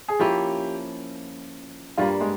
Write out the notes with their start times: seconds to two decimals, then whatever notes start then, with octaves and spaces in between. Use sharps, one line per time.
0.08 G#4
0.19 F3 A#3 C#4 E4 G4
1.97 G2 G3 A#3 F4
2.21 G#3